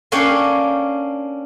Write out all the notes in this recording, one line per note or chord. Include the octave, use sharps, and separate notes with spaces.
A#3 C#4 D4 C#5 F5 G5